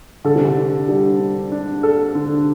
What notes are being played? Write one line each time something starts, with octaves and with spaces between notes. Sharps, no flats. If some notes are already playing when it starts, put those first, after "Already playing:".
D3 A4
C3
D3
D4
G3 D4
D4
D4
A4
D3